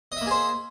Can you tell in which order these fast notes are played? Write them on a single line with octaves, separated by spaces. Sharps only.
D#5 E5 A#3 G#4 C5